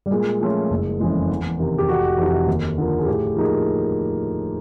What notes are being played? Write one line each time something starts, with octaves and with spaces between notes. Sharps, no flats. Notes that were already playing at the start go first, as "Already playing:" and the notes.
G3
A#2 G#3
F3 A3 C#4 F4
F#1
F2 C#3 E3 G#3
E2
C3 D#3
G4
F1 F#4
F2 C3 E3
D#2
D3 F3 A#3
G#4
A2 G4
F3 A#3 D#4 G#4